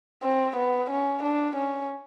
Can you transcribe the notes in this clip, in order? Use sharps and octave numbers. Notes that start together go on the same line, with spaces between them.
C4
B3
C#4
D4
C#4